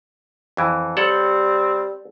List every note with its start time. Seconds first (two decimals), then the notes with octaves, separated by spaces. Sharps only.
0.57 F2 E3
0.97 G3 C4 A4 C#5 F#5